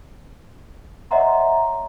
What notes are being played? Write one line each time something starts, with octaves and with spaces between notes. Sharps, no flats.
C#5 D#5 E5 F#5 A#5 C6